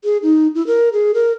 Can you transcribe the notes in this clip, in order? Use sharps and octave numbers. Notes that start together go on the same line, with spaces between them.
G#4
D#4
E4
A#4
G#4
A#4